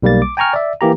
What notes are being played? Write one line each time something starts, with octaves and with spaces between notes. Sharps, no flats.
B1 G3 A#3 A6
D6
G5 G#5 A#5 C#6 F6
D5 E5
E3 A#3 G4 A#5